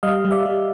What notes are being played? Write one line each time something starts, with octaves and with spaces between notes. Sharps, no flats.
G3 D#5 F5
G3
D5 E5
G3